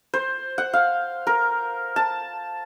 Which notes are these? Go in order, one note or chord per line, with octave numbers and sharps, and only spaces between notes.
C5
F#5
F5
A#4
A5